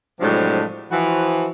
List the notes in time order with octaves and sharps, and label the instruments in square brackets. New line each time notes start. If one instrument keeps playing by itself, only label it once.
[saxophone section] A2 C3 F3 F#3 G#3 D4
E3 F3 F#4